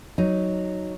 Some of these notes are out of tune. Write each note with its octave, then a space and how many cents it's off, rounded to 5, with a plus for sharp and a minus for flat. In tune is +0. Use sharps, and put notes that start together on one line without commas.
F#3 +0 D#4 +0